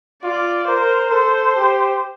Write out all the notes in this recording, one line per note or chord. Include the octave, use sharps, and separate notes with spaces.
F4 D5
A#4 C5
A4 C5
G4